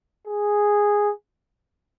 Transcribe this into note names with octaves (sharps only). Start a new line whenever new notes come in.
G#4